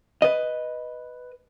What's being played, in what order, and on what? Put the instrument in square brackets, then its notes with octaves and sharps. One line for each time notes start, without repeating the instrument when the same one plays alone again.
[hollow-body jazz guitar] B4 D#5